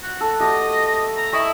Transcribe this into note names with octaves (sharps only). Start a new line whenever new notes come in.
F#4
A4
A3 F#4 G4 D#5
A#5
E4 D#5 E5 C#6